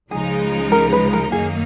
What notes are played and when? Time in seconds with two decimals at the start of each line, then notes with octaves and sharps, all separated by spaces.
0.11 C#2 C#3 F3 G#3 D#4 G#4
0.72 A#4
0.93 B4
1.13 A#4
1.32 F#2 D#3 F#3 A#3 D#4 G#4